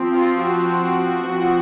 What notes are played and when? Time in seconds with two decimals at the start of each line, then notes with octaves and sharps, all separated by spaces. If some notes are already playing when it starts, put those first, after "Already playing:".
Already playing: F3 C4
0.14 F4
0.42 F#4
1.31 F3 C4